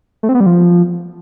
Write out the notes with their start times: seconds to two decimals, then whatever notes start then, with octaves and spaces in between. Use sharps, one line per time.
0.23 A3
0.29 C4
0.35 B3
0.40 G3
0.46 F3